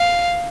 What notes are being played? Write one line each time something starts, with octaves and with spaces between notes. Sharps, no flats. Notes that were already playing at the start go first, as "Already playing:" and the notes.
Already playing: F5